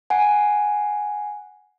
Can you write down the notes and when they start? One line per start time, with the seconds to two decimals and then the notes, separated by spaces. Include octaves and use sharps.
0.10 F#5 G#5